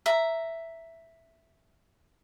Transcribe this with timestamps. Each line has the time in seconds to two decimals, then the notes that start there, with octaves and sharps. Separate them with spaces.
0.06 E5 A#5